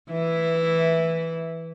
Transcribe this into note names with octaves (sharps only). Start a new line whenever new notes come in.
E3 E4